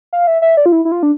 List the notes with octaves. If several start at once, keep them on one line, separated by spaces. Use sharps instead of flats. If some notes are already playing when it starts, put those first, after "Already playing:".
F5
E5
E5
D5
F4
E4
E4
F4
D4